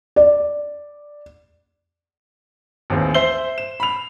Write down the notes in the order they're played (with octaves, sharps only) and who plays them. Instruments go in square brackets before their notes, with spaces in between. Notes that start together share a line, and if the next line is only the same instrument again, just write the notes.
[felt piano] D5
[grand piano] A1 D#2 C4 G#4
C5 E5 C7 G7
E7
B5 F7